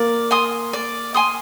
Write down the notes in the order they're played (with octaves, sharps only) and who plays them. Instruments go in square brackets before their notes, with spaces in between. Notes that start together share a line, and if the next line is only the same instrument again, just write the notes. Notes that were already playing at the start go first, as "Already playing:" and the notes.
Already playing: [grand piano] A#3 A#4 [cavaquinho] D5
[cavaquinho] G#5 C6 D#6
D5
G#5 C6 D#6